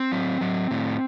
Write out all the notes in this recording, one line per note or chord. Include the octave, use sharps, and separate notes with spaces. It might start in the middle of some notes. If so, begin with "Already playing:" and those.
Already playing: C4
F#3
F#3
A2